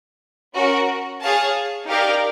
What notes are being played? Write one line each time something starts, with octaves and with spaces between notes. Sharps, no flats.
C#4 F#4 A#4
G#4 C#5 F5 A5
D#4 G4 A#4 D5 F5